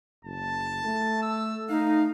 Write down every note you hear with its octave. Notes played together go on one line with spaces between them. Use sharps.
F#1 A5
A3
E6
A3 D#4 F5